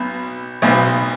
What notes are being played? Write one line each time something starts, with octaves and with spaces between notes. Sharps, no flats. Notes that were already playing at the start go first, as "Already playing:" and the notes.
Already playing: B1 B2
B1 B2